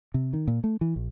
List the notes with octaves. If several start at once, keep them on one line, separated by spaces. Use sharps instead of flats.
C3
D#3
A#2
A3
E3
A#1